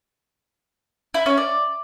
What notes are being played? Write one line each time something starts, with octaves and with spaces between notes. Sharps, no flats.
E4
C#4
D5